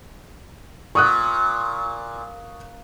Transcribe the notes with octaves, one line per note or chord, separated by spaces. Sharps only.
A#2 C#6 D#6 F#6